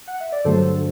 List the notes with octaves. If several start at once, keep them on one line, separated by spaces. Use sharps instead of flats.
F#5
E5
D5
G2 D3 F#3 A3 A4 C5